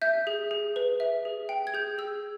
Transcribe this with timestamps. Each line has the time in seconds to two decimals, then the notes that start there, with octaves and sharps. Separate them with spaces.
0.02 E5 G6
0.27 G#4
0.51 G#4
0.76 B4
1.00 E5
1.25 G#4
1.49 G5
1.67 G#6
1.74 G#4 G6
1.98 G#4 E6